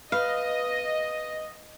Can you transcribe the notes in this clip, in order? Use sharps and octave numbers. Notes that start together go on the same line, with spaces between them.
B4 D#5 F5